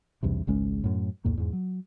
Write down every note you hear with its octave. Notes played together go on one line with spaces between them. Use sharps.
B1 E2 G2 C3
G#1 C#2 G#3 C#4
F#2 A2
B1 E2 A2 A#3
E2 G#2
F#3